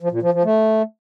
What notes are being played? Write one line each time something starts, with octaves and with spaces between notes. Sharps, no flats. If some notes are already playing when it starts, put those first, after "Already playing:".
F3
A#2
F3
F3
A3